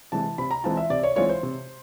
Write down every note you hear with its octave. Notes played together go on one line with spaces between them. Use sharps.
C3 E3 G#3 A5
C3 B5
A#5
E3 G#3 C4 F4 A5
E5
C3 D5
C#5
E3 G#3 C4 F4 C#5
C5
C3